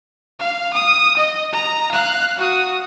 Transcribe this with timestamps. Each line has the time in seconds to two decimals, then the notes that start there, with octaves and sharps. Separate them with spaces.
0.40 F5
0.73 D#6
1.17 D#5
1.52 A#5
1.92 F5 F#6
2.37 F#4 D#6